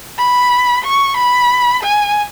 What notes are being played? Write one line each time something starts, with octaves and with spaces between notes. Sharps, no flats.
B5
C#6
B5
G#5